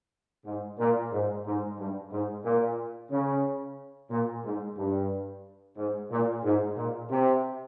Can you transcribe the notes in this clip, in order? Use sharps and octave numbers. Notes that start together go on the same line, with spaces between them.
G#2
A#2
G#2
G#2
G2
G#2
A#2
C#3
A#2
G#2
G2
G#2
A#2
G#2
A#2
C3